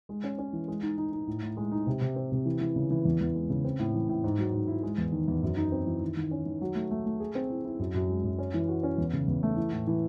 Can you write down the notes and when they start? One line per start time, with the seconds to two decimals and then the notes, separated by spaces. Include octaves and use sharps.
0.09 G#3
0.24 C#4
0.39 C#4
0.53 E3
0.68 G#3
0.82 D#4
0.98 D#4
1.12 D#4
1.27 A2
1.42 A2
1.57 G#3
1.72 D#4
1.87 C3
2.01 C3
2.16 C4
2.32 C3
2.46 E3
2.61 E3
2.76 C#3
2.90 E3
3.05 E2
3.21 E2
3.35 G#3
3.50 C#3
3.65 C4
3.79 A2
3.94 E3
4.09 A2
4.24 G#2
4.39 F#3
4.53 G#2
4.68 E4
4.83 G#3
4.98 E2
5.12 D#3
5.28 E2
5.43 F#2
5.57 D#4
5.72 C4
5.87 E3
6.01 D#3
6.17 D#3
6.31 C#4
6.46 D#3
6.61 F#3
6.75 A3
6.91 A3
7.06 A3
7.20 G#4
7.35 C4
7.50 E4
7.65 E4
7.79 F#2
7.95 F#2
8.09 G#3
8.24 F#2
8.38 C#4
8.54 E3
8.69 F#4
8.83 C#4
8.98 E2
9.13 C#3
9.28 E2
9.43 A3
9.57 E3
9.72 A2
9.87 E3